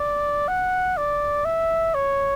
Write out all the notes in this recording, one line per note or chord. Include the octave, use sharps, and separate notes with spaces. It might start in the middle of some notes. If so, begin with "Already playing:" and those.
Already playing: D5
F#5
D5
E5
C#5